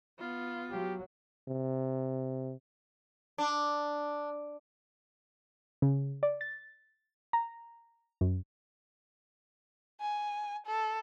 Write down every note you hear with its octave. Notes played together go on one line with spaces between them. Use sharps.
B3 F4
F#3 G4
C3
D4
C#3
D5
A6
A#5
F#2
G#5
A4